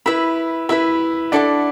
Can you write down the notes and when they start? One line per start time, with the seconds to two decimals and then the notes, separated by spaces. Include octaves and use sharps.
0.06 E4 B4 E5 B5
0.69 E4 B4 E5 B5
1.32 D4 E4 A4 F#5 D6